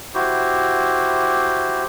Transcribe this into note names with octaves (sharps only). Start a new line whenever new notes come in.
E4 F#4 G4 C5